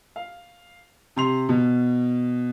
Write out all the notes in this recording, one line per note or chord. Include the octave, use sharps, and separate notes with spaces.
F5
C3 C6 F7
B2